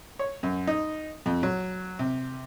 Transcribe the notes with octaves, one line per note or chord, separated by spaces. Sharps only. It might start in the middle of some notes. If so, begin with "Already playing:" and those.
C#5
F#2
D#4
F2
F#3
C3